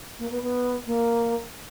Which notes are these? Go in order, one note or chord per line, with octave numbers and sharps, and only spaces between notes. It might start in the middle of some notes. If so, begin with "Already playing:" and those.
A#3
B3
B3
A#3